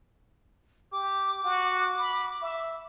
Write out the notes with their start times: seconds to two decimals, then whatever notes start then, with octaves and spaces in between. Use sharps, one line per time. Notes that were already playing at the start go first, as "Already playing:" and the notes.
0.92 G4 D6
1.44 F#4
1.98 B5
2.42 E5